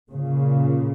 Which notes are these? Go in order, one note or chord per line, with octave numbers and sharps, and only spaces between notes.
A#2 C#3